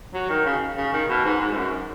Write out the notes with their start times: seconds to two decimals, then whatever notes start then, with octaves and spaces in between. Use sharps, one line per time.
0.14 F#3
0.29 D#3
0.45 C#3
0.77 C#3
0.93 D#3
1.09 B2
1.25 G#2
1.41 G#2
1.52 G#2
1.57 F#2